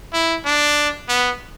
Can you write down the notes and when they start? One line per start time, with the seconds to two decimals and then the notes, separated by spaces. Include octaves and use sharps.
0.13 E4
0.45 D4
1.09 B3